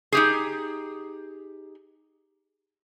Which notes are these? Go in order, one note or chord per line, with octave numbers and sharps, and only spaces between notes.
D#4 G4 G#4